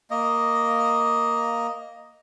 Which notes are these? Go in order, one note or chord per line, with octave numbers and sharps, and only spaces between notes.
A#3 D#5